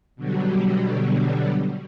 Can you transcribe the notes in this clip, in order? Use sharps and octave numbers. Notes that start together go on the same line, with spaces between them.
B2 D3 F#3 G3